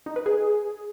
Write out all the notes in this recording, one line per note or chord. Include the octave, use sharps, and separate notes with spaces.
D#4
B4
G#4